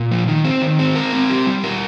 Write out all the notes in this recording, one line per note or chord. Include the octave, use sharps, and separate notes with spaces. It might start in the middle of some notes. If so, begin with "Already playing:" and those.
Already playing: A#2
F3
D#3
C4
D#3
C4
A#4
C4
G4
G3
A#4